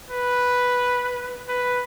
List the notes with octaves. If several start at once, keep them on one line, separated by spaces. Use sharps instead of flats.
B4
B4